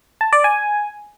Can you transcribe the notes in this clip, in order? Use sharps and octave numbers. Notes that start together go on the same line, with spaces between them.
A5
D5
G#5